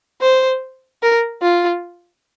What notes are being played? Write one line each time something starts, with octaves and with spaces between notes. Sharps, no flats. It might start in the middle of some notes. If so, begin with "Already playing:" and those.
C5
A#4
F4